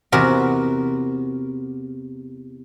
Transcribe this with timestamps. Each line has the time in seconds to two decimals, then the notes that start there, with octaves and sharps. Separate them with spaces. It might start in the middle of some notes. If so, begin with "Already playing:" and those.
0.12 E2 C3 F#4 A#4